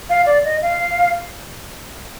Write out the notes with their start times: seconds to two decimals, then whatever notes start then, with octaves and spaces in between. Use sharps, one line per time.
0.10 F5
0.26 D5
0.45 D#5
0.62 F5